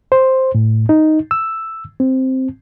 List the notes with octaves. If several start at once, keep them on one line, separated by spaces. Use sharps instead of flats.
C5
A2
D#4
E6
C4